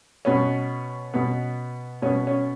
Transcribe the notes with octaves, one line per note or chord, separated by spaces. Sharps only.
B2 B3 C#4
B2 B3
B2 B3 C#4
C#4